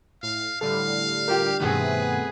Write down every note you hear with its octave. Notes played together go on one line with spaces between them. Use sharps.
A2 F5
A2 D3 G3 A4 F5
F4 G4 A#4
G2 B2 D#3 A3 B3 C4 G#4 B4